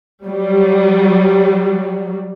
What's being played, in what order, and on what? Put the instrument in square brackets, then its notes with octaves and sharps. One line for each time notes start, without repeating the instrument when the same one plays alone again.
[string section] F#3 G3